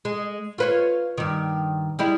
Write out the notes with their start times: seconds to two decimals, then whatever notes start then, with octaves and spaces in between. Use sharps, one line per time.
0.05 G#3
0.58 F4 B4 C#5
1.18 G2 D#3
1.99 G3 G#3 E4